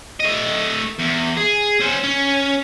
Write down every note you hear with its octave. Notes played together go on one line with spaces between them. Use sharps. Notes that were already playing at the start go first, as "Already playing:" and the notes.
A3 D#5
E2
G#4
C#4 C5
C#4